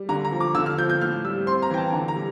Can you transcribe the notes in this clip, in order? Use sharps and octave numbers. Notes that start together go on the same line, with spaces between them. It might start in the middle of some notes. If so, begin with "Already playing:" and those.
Already playing: G3
D3 A#5
A#5
F3
D6
D3 E6
F6
F3 G6
G6
A2 F6
G3 E6
C4 C6
A#5
E3 G5
A5
D3 A#5
A#5
G3